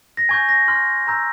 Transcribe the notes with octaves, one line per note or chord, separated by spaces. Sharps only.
A#6
G#5 C#6 G6 G#6
A#6
C6 F6
A#5 E6 G6